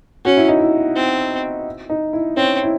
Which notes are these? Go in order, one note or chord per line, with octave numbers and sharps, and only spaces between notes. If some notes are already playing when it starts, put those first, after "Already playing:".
C#4 F#4
E4
D#4
E4
C4
D#4
E4
C4 C#4
E4